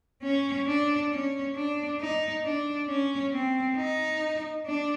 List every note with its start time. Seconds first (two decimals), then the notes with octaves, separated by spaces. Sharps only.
0.23 C#4
0.68 D4
1.12 C#4
1.56 D4
2.00 D#4
2.44 D4
2.89 C#4
3.33 C4
3.77 D#4
4.66 D4